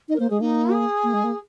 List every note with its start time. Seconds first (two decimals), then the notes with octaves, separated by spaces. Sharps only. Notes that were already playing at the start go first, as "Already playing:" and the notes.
0.09 D#4 D#5
0.15 A#4
0.19 A#3 C5
0.30 G#3 G#4
0.40 A#3 D#4
0.72 G#4
1.03 A#3
1.14 G#3
1.24 A#3